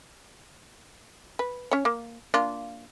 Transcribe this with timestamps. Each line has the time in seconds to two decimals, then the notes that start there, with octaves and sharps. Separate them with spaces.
1.39 B4
1.71 C#4 C#5
1.85 A#3
2.34 A#3 D4 F4